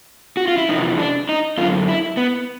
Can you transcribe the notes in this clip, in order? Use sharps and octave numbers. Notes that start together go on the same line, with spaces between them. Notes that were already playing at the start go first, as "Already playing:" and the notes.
F#4
F4
E4
F2 C3 E3 D#4
D4
D#4
F#2 D3 F4
E4
B3